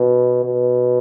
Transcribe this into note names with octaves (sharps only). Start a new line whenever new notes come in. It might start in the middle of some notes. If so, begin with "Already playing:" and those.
Already playing: B2
B2